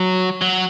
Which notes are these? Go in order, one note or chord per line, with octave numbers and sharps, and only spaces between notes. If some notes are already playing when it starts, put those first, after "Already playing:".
Already playing: F#3
F#3